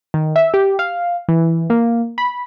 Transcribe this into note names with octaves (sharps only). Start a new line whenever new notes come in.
D#3
E5
G4
F5
E3
A#3
B5